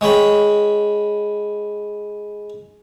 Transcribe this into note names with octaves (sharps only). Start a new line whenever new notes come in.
G#3 C#5 G5 B5